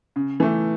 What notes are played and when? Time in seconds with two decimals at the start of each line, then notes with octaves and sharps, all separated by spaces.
0.16 C#3
0.40 E3 A3